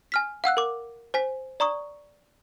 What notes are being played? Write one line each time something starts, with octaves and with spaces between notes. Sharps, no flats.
G#5 F6 B6
F5 F#5 E6 F#6
A#4 D6
C5 G#5 B6
D5 A#5 C#6 D#6